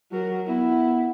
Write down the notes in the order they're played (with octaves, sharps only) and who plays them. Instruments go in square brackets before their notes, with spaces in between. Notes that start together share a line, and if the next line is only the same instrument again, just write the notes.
[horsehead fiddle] F#3 A#4
[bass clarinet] B3 [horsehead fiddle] E4